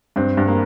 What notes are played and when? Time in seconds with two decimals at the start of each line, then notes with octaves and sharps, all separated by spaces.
0.16 G2 C4
0.37 G2
0.48 A#3